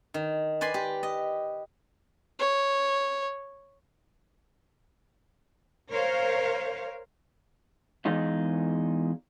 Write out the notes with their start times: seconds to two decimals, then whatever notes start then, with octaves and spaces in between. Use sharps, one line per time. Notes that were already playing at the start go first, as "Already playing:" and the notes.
0.14 D#3
0.61 B4 D5 G#5 C6
0.74 G4
1.03 D#5
2.39 C#5
5.91 A#4 C5 C#5 F5
8.05 E2 G#3 D#4 F4